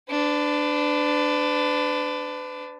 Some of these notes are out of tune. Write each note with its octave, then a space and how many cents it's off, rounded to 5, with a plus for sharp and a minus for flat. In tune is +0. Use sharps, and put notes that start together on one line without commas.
D4 +0 B4 +40